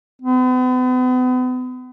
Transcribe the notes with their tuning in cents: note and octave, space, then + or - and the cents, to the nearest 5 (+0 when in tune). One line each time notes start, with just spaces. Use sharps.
B3 +40